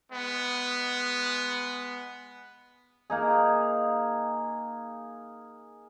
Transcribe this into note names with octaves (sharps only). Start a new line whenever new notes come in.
G#3 B3
A#3 D#4 G#4